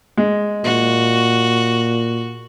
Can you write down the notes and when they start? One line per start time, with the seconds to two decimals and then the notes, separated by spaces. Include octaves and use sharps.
0.17 G#3
0.64 A#2 F#4